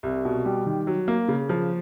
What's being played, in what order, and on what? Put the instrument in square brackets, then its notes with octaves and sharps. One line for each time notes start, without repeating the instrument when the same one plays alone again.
[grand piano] C2
B2
G3
D#3
F#3
A#3
C#3
F3